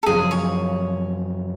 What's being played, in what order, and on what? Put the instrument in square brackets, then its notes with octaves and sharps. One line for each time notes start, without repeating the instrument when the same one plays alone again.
[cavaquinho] A4
[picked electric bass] F#2 C#3 F3 [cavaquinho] G#4
[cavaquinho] C#5